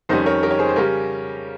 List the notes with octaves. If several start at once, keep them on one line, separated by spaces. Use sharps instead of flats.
F2 D#3 G3 C#4 C5 D#5
A#4 C#5
G4 A#4
C#5
G#4 C5
C5
C#3 G3 C#4 G4 A#4